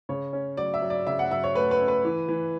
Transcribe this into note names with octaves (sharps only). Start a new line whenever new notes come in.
C#3 C#5
C#4
F#3 D5
E5
F#3
D5
C#3 E5
F#5
F#3 E5
C#5
A3 B4
B4
C#4
B4
E3
E3